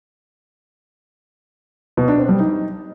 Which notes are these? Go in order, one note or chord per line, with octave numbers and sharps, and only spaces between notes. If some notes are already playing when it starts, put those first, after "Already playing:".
B2
D4
C4
G3
D#4